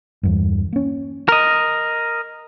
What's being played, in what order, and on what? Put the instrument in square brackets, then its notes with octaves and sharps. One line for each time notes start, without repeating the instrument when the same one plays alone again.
[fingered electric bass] E2 G2
A#3 C#4
[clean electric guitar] A#4 D#5